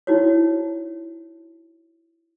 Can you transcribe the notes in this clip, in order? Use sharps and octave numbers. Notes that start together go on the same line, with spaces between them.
D#4 E4 F#4 C5 C#5